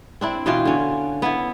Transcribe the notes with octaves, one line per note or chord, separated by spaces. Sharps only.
C4 D4 E4
B2 E3 F4 G5
D3 C#4
B3 E4